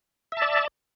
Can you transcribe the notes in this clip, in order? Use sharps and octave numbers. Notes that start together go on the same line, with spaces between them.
D5 E5 A5